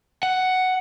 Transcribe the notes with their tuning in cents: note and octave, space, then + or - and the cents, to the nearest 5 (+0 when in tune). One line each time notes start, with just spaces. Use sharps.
F#5 +5